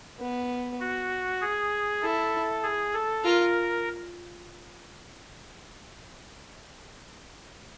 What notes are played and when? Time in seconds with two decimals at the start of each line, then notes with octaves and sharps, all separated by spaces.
0.20 B3
0.80 F#4
1.42 G#4
2.02 E4 A4
2.63 G#4
2.94 A4
3.24 F4 A#4